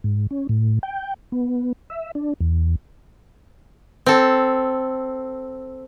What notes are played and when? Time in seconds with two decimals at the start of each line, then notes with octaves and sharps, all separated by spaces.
0.04 G#2
0.31 C#4
0.49 A2
0.83 G5
1.32 B3
1.90 E5
2.15 D4
2.40 E2
4.06 C4 A4